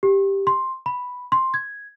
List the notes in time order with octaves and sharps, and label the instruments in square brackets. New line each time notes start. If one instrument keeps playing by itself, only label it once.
[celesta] G4
C6
B5
C6
G#6